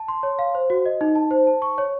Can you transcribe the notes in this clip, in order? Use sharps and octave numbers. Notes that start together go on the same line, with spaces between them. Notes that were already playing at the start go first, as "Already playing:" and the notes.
Already playing: A5
C6
C#5
F5
C5
F#4
D#5
D#4
A5
C5
A5
C#6
C#5